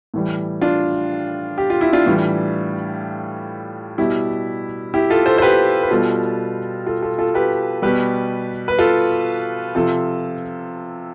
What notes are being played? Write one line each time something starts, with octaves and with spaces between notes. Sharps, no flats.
A2 E3 G3
D4 F4
G4
F4
E4
D4 F4
A2 E3 G3
B2 G3 E4 G4
E4 G4
F4 A4
A4 C5
C5
G4 B4
B4
B2 G3 F4 A4
F4 A4
F4 A4
F4 A4
G4 B4
B2 G3 G4 B4
B4
F4 A4
C3 F3 F4 A4